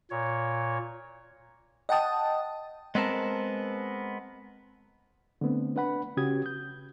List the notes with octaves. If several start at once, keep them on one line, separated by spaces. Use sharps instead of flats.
A#2 C#5
D#5 F#5 G5 A5 D#6
G#3 B3 C4 A#4 A5
D3 A3 B3 C4
D4 B4 F#5 B5
C#3 C#4 F#4 G4 D#6 G#6
G6